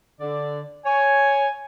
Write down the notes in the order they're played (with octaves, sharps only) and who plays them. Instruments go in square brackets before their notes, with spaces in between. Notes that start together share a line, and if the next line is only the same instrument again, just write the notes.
[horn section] D3 D5
[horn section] C#5 [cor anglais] G#5